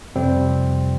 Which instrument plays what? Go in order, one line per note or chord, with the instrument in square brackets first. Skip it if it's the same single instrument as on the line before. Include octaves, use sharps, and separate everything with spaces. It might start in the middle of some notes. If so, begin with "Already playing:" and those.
[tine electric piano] F2 C3 G3 C4